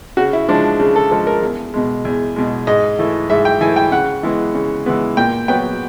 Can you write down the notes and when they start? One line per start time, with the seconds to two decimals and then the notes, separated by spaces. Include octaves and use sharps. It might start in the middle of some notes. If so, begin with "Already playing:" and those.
0.17 C#3 F#4
0.33 E4
0.49 F3 G#3 D4
0.80 C#3
0.96 A4
1.11 F3 G#3 A4
1.27 A#4
1.42 E2
1.74 B2 G#3
2.05 E2
2.36 B2 G#3
2.67 G#2 D#5
2.99 E3 A3
3.30 G#2 E5
3.45 G5
3.61 E3 G#5
3.64 A3
3.76 G5
3.92 C#3 F#5
4.23 E3 G#3 B3
4.54 C#3
4.86 E3 G#3 B3
5.17 A#2 G5
5.48 F#3 B3 G5